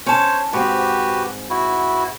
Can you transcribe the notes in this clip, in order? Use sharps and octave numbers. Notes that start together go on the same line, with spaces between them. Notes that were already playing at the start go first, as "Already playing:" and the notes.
C#4 C5 C#5 A5
G#2 C4 F#4 G4 B4
E4 F#4